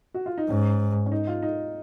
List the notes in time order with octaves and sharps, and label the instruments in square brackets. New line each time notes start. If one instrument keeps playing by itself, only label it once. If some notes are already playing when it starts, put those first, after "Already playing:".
[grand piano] F#4
F4
D#4
[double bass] G#2 [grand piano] C#4
[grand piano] C#4
D#4
F4
D#4